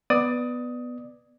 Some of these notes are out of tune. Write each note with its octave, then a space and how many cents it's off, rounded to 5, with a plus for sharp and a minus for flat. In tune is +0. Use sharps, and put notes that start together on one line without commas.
B3 +0 D5 +15 D#6 +15